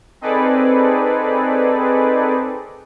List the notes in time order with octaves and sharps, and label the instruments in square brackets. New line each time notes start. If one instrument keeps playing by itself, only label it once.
[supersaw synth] C4 D#4 G#4 A4 B4 D5